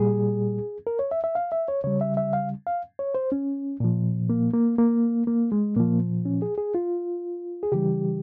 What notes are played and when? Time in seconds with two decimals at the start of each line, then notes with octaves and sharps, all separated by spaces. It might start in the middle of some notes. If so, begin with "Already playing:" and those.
Already playing: A#2 G3 G#4
0.87 A#4
0.99 C#5
1.11 E5
1.24 E5
1.35 F5
1.52 E5
1.68 C#5
1.84 C#3 G3 C#5
2.01 E5
2.17 E5
2.33 F5
2.67 F5
2.99 C#5
3.15 C5
3.32 C#4
3.80 A#2 F3
4.30 A#3
4.54 A#3
4.78 A#3
5.27 A#3
5.52 G#3
5.76 A#2 F3 A#3
6.25 C#4
6.42 G#4
6.58 G#4
6.75 F4
7.63 G#4
7.72 C#3 E3 G3 G4